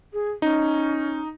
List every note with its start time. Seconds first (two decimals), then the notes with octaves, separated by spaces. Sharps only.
0.13 G#4
0.42 C#4 D#4